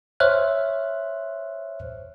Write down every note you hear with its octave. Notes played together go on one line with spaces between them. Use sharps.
C5 C#5 E5 F6 F#6